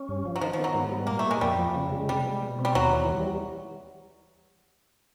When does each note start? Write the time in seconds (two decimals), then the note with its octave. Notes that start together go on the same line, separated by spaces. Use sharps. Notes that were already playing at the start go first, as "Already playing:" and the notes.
Already playing: C#4
0.08 G2
0.25 F3
0.36 F#3
0.41 D#3 F3
0.53 F3
0.58 B3
0.64 F#3
0.75 G#2
0.92 G3
1.07 A#2 A#3
1.19 A3
1.25 A#3
1.31 G#3
1.41 F2 G3
1.59 F3
1.75 C#3
1.92 G#3
2.08 C3 G3
2.25 G#3
2.41 B2
2.59 C4
2.65 G3
2.75 D#2 F#3
2.93 E3
3.09 G3